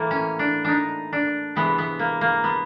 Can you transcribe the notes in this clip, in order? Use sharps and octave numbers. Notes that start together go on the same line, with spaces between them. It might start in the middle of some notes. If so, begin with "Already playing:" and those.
Already playing: A2 E3 A3 A#3
C#4
D4
D4 D#4
D4
C3 E3 G#3 B3
B3
A#3
A#3
B3